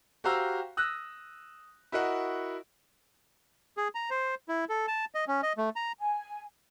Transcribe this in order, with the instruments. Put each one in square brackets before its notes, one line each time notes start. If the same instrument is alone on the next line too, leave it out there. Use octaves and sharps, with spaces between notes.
[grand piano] F#4 G4 C5 F5 A#5 E6
D#6 E6 F#6 A#6
E4 F#4 A#4 D#5 F#5
[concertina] G#4
A#5
C5
E4
A4
A5
D#5
C#4
D#5
A3
A#5
[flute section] G#5